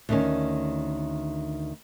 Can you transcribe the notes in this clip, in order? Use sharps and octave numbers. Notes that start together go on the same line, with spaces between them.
D2 D#3 C#4